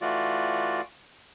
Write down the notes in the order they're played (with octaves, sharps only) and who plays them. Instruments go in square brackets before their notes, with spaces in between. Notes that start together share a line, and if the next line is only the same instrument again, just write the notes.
[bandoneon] E3 A3 F4 F#4 D5